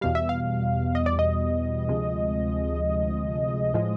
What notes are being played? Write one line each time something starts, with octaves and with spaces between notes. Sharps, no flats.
E2 B2 G3 F5
E5
F5
D#5
D5
D#5
D2 C3 F3 G#3
A2 F3 G#3